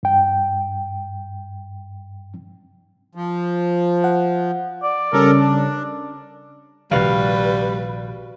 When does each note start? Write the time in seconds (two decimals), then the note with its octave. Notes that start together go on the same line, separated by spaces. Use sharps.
0.03 G2 G5
3.15 F3
4.04 F#5
4.83 D5
5.13 C#3 G3 C#4 A4 A#4
5.39 D4
6.91 A#1 C3 D#3 G3 F#4 B4 F5